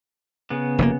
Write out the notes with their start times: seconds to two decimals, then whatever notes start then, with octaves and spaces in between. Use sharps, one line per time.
0.50 C#3 B3
0.78 F1 C3 A#3